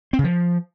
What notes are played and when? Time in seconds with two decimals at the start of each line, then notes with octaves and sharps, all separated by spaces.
0.13 C4
0.19 C#3
0.24 F3